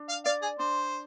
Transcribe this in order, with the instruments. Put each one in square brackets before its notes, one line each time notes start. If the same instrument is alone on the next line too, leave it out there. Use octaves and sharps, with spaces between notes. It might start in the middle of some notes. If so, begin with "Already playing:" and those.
Already playing: [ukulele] D4
[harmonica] F5
[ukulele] D5 [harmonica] F5
[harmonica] G#4
[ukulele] D4 [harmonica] C5